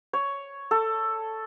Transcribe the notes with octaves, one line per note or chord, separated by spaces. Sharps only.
C#5
A4